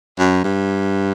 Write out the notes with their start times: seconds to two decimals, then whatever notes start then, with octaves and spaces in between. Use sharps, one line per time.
0.18 F#2
0.44 G2